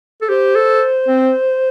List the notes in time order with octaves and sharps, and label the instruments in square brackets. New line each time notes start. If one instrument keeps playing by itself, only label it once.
[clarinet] A4
[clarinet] G4 [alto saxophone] C5
[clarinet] A4
C4